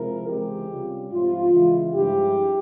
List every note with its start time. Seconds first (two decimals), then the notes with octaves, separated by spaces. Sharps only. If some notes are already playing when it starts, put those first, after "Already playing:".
Already playing: C3 F3 G#3 E4 A#4
0.29 C#2 C3 E3 G#3 C4 G4
0.70 C3 G3 C#4 F4
1.11 G#2 F3 C4 E4 F4
1.52 C#3 E3 G#3 E4
1.94 G2 F3 G#3 E4 G4